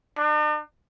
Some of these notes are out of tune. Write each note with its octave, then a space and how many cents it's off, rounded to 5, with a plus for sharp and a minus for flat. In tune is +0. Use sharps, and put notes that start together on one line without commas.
D4 +45